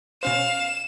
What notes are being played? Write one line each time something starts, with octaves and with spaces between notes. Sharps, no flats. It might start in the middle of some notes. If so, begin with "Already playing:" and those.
B2 C#4 C5 F5 E7